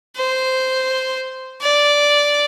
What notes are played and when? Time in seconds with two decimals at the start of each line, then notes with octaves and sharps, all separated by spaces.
0.16 C5
1.62 D5